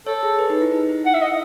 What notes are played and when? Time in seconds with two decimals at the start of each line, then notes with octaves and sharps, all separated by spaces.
0.06 A4 C#5
0.23 G#4
0.39 B4
0.50 D#4
0.62 E4
0.72 D#4
0.89 E4
1.05 E4 F#5
1.14 E5
1.22 D#5